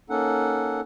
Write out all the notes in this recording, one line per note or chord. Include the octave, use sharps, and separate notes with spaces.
A#3 C#4 D#4 A4 F#5